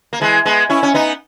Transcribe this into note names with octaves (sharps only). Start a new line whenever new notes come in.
A#3
E3 G#3
G#3 B3
C#4 E4
C#4
B3 D#4